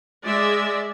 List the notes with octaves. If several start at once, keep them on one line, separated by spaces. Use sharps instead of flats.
G#3 D5 E5